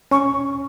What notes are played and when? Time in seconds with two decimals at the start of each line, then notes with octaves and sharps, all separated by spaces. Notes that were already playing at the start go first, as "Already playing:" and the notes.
0.11 C#4 C#6